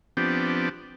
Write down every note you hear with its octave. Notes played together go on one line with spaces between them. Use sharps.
F3 B3 C4 D4 G4